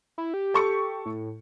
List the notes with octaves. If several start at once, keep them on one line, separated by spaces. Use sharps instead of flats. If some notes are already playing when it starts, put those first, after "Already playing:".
E4
G4
A4 C#6 C#7
A2